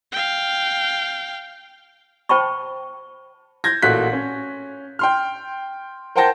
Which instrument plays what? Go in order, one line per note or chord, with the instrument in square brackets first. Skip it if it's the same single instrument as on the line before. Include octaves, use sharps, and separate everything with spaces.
[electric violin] F5 G5
[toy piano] C5 G5 A5 B5 C#6
[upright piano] G6 G#6 A#6
A1 A#2 A3 F#4 F#6 B6
C#4
G5 C6 F6
A#4 C5 F#5 G5 A5 A#6